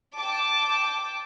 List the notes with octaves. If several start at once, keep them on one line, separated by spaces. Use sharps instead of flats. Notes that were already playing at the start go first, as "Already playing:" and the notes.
G5 A5 D6